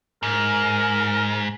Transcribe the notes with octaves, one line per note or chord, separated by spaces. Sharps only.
G#2 A#4